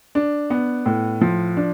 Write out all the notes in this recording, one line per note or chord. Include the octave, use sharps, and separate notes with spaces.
D4
B3
A2
F3
D4